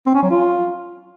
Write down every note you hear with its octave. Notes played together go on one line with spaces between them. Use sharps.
C4
C#4
F#3
F4